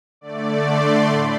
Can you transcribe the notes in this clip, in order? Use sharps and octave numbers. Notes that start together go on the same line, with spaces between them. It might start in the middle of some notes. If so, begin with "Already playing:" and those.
D3 A3 D5
C6
A2 B5